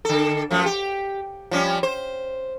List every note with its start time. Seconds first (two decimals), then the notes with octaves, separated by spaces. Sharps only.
0.05 D3 A4
0.51 F#2 F3 A3
0.66 G4
1.51 F3 G3 C#4
1.83 C5